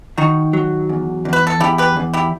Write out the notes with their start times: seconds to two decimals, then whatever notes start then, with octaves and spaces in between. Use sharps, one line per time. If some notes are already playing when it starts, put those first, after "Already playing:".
0.17 D#3 D#4 F#4
0.53 F#3
0.89 E2
1.25 E2
1.33 B4
1.47 A4
1.60 E2 E4 G4
1.78 G4 B4
1.97 E2
2.13 E4 G4